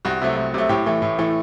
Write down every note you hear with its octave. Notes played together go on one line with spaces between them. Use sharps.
C2 F#4
C3 F#3 A3
C2
C3 F#3 A3
A2 G4
E3 A3
A2
E3 A3